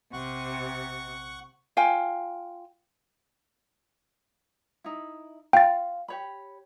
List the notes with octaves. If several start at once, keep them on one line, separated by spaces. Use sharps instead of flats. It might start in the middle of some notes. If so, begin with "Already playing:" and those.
A#1 C3 F#5 C#6
F4 F5 G5 G#5
D#4 E4
F4 F5 G5 A6
G4 C#5 B5